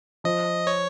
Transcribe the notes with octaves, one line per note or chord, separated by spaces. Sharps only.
F3 D#5
C#5